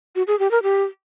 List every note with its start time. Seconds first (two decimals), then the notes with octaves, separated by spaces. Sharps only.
0.16 F#4
0.27 G#4
0.39 G4
0.51 A#4
0.63 G4